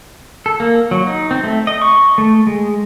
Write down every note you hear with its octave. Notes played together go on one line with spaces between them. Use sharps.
A4
A#3
F#3
D#4
C4
A3
D#5
C#6
A3
G#3